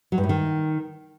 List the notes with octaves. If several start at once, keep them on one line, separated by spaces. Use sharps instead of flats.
F#3
G2
A2
D#3